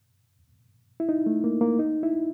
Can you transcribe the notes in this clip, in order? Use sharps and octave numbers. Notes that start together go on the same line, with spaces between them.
E4
D#4
A3
A#3
A#3
D#4
E4